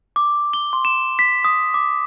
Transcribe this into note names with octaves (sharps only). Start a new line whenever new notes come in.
D6
G7
C6
E7
B6
D#6
D6